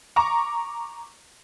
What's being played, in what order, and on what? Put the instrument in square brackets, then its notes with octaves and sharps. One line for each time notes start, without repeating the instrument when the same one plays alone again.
[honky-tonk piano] A#5 C#6 D6